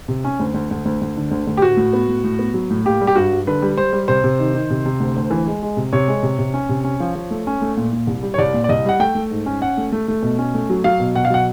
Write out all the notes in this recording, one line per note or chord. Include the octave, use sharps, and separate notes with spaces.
C3
C#4
D2
D2
D2
D2
D2
D3
D2
D2
G4
A2 F#4
A2
B3
A2
A2
B3
F#3
A2
A#3 G4
G3
G4
G2 F#4
G3
D3 B4
G3
G3 C5
G3
C3 C5
C3
D#3
D#3
C3
C3
D2
D2
E3
G#3
G#3
C3
C3 C#5
G#3
C3
C3
C#4
C3
C#4
F3
F3
A3
C#4
A3
A#2
A#2
C2
G3
C#5
C2 D5
A#2
D5
C2 D#5
G3 F#5
A3 G5
A3
G#2
C#4
C#4 F#5
A3
A3
A3
B2
C#4
A3
F#3
F#3 F5
B2
B2 F#5
F5
F#3 F#5